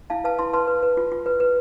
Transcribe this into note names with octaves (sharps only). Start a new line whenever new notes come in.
E4 F5 A5
B4 F5 A5
E4 A5 C6
B4 A5 C6
B4
B4
F4
F4
B4
B4